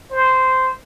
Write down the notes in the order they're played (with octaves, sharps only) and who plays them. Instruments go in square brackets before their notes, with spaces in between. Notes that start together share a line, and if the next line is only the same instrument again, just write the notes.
[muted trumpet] C5